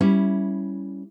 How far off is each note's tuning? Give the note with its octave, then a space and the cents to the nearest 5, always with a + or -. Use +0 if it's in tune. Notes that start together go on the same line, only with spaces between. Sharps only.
G3 -5 C#4 +0 E4 +0